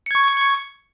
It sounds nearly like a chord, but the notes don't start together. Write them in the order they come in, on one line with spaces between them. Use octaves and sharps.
C#7 G#6 C#6